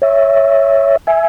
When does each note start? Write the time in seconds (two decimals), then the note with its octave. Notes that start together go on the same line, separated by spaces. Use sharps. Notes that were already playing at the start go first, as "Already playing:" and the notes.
0.02 C#5 E5
1.07 E5 G#5